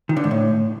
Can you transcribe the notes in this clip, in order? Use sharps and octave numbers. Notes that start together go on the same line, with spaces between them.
D#3
D3
G#2
A2